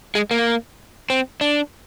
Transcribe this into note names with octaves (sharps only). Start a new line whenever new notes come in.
G#3
A#3
C4
D4